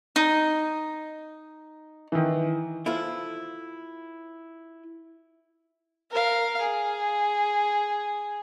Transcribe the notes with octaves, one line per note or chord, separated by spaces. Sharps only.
D#4
D#3 E3
E4 F4 A4 C5
A#4 F5
G#4